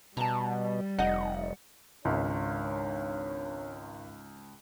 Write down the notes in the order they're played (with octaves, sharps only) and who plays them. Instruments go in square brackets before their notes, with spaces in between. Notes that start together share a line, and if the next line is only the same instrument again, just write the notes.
[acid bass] B2 [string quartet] G3 [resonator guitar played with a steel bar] A5 A#5
[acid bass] F1 [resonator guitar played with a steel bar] D#4 D#5 [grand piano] F#5
[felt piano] G#1 [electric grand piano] C#2 [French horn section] D4 C#5